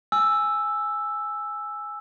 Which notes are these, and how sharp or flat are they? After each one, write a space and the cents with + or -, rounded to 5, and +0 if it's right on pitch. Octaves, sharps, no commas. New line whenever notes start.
G#5 +0 E6 +0